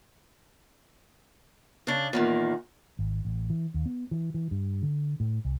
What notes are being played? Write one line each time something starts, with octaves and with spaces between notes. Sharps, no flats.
C#3 D4
E2 A#2 D#3
G#1
A1
E3
D#2
B3
E3
E3
G2
D3
A2
C2